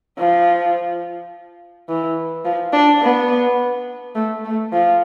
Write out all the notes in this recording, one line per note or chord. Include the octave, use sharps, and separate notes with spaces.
F3
E3
F3
D4
B3
A3
A3
F3